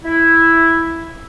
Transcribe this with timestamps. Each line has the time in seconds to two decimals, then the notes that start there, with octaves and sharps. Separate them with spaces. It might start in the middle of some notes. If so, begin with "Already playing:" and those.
0.05 E4